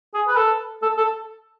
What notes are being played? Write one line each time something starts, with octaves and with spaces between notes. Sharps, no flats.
G#4
B4
A4
A4
A4